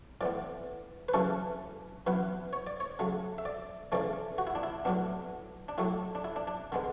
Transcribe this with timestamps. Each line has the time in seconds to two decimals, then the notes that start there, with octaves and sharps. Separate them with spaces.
0.21 A2 E3 B3 D5
1.09 B4
1.14 F#2 C#3 E3 A3 A4
2.07 F#2 E3 B3 B4
2.53 C#5
2.67 D5
2.80 C#5
2.99 C#3 F#3 A3
3.38 E5
3.45 D5
3.92 C#3 E3 A3 D5
4.38 F#4
4.47 E4
4.55 D4
4.63 E4
4.85 A2 F#3 B3 D4
5.68 D4
5.78 A2 F#3 A3 E4
6.15 D4
6.24 E4
6.36 D4
6.47 D4
6.72 D3 G#3 B3